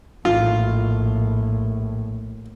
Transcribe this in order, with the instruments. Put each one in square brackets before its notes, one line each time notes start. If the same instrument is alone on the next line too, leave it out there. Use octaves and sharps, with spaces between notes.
[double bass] A#1 A2 [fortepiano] F4